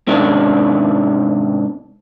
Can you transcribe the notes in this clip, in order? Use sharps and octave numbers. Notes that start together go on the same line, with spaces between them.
G#2 C3 D#3 C#4 D4